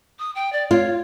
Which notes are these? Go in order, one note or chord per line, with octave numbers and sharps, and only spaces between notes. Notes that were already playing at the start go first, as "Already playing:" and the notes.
D#6
G5
D5
F4 C#5